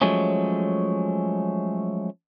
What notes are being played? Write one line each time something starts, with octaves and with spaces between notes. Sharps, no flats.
F3 F#3 G#3 A3 C#4